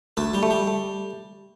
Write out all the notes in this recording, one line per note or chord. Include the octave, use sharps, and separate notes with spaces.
D2 A3 A4
G3 G4
A3
G3 G4
A3